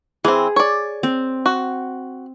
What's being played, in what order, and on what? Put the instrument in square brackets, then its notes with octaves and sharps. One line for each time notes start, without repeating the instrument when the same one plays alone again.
[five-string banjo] E3 C4 [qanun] G#4
[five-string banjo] C#5 D5
[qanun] C4
[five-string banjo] F#4